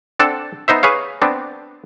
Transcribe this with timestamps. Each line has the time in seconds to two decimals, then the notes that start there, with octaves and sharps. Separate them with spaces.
0.19 C4 D4 A4 F#5 A5
0.68 B3 D#4 C5 E5
0.83 G#4 B4 C#5 F5
1.22 B3 C4 D4